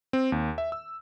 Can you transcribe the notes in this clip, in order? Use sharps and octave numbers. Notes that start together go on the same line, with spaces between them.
C4
D#2
E5
E6